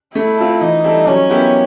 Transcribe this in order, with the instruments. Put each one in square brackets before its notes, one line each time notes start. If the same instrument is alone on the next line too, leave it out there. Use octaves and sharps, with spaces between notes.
[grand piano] A3 [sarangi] E4
[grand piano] C4 F4 A4
[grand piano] E3 [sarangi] D#4
[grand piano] G3 C4 E4 A4
[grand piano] F#3 [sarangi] C#4
[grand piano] B3 E4 G4 A#4